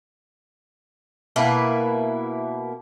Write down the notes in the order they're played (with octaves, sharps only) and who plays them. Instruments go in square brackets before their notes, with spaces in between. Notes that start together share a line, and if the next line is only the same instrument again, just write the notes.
[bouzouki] B2 A#3 E4 B4